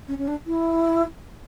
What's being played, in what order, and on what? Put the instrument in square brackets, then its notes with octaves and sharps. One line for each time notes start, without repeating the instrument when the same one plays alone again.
[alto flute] C#4
C#4
D4
E4